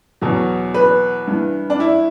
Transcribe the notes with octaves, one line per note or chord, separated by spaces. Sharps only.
E2 B2 F#3
B4
G2 E3
D4
E4